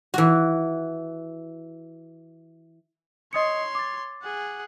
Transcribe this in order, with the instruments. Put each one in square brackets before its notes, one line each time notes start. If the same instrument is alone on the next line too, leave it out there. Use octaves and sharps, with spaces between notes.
[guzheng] E3 F#4
[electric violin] C#5 C6 [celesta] D#5 D#6 C#7
[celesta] D6 A6
[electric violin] G#4 F#5